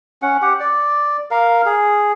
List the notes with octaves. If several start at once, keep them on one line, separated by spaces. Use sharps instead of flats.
C#4 F#5
G4 F#5
D5
A#4 F5
G#4